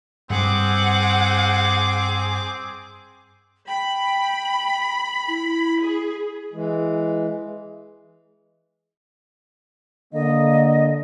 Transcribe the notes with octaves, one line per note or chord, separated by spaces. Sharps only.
G2 G3 C4 G#4 F#5 D6
G5 B5
E4
G#4
E3 G#3
D3 A#3 D#5